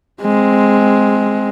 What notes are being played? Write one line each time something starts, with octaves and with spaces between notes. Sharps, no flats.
G#3 C4